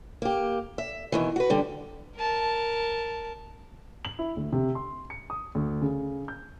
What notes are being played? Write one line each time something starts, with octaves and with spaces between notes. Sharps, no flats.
A#3 G4
E5
B2 D#3 E3
F#4 B4
D3 G3 D4
A#4 A5
F#7
E4
D2
C3
C6
C#7
D#6
D2
C#3
G6